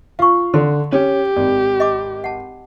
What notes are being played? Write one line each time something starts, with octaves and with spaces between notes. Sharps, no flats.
F4 F5 C#6
D3 A4 C6
C#4 G4
G#1 D5
D#5 D6
F#5 A5